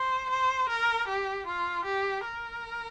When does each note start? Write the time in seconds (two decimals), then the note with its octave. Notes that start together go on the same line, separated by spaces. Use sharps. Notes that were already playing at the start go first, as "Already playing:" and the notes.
Already playing: C5
0.30 C5
0.69 A#4
1.08 G4
1.47 F4
1.85 G4
2.25 A#4